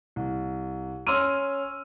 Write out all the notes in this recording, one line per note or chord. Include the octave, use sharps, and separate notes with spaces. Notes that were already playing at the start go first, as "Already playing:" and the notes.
C2
C#4 C6 E6 F6 D#7